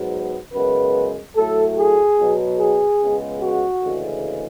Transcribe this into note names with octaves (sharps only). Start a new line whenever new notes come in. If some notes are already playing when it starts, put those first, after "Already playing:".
Already playing: G#2 F#3 B3
F#2 C#3 G#3 B3 B4
A2 F#3 A3 A4
G#4
B2 F#3 B3
G#4
C#2 C#3 G#3 B3
F#4
D2 C#3 E3 G#3